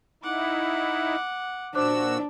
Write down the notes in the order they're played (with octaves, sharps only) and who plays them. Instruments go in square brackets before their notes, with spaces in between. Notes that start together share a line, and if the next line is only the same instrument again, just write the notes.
[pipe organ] D#4 E4 [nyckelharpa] F#5 D6
[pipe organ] A#2 F#4 E6 [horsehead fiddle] D4 [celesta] C5 D6 F#6